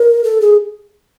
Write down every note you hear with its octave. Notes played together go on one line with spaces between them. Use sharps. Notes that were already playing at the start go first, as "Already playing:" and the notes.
Already playing: A#4
A4
G#4